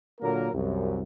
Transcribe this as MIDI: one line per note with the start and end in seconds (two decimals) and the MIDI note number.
0.21 0.49 46
0.21 0.49 50
0.21 0.49 54
0.21 0.49 58
0.21 0.49 70
0.54 1.01 36
0.54 1.01 42